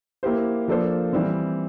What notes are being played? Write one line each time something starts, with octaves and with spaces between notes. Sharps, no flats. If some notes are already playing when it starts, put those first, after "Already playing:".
A#3 E4 G4 C5
F3 A#3 D4 A4 C5
E3 G3 C4